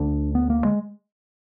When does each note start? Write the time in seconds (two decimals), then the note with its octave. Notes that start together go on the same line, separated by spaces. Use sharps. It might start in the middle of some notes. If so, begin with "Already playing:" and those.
Already playing: D2 D3 D4
0.35 B3
0.50 A#3
0.65 G#3